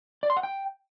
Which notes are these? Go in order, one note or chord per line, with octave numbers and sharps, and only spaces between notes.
D5
C6
F#5
G5